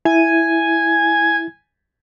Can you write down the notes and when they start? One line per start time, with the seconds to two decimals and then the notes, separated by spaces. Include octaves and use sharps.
0.05 E4 G#5